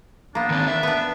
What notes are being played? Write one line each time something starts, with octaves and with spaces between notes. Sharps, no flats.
A#3 B3 D4
D#3 C4
D4 E5
B3 D4 B4